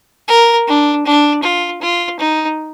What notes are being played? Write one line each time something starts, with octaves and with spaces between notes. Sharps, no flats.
A#4
D4
D4
F4
F4
D#4